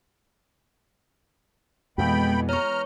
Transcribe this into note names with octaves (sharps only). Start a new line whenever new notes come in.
F2 B2 E3 G#3 B3 G5 B5
C#5 A#5 C#6 F6